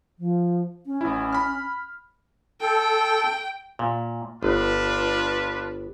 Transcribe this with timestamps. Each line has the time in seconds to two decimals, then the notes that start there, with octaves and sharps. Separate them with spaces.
0.19 F3
0.86 C#4
1.01 A1 E4
1.33 B5 F6
2.61 A4 G5
3.79 A#2
4.43 G1 D4 F4 B4